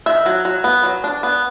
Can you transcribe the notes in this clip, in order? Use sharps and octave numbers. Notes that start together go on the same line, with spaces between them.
D#3 E5
F#3
F#3
B3
F#3
D4
B3